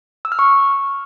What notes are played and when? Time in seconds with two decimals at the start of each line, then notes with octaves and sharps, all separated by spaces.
0.25 E6
0.32 F6
0.39 C#6